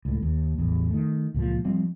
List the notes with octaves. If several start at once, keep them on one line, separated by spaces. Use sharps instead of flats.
C#2 A2
D#2
A1 E2
D#3 A3
C#2 A#2 F3
F3 G3 C4